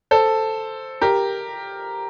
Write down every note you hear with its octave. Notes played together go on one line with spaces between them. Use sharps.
A4 C5
G4 A#4